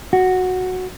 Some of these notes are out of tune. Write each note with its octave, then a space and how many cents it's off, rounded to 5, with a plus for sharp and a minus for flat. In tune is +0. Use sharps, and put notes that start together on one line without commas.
F#4 -5